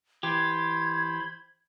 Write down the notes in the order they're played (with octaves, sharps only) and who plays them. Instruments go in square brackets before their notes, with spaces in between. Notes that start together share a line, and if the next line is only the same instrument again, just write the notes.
[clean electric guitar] E3 G4 [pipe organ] C5 B5 C6 [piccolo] G#6